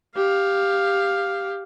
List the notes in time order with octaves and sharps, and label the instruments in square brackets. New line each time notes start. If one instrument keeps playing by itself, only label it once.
[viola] G4 F5